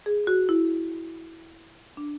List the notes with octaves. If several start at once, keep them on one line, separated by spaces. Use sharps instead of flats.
G#4
F#4
E4
D4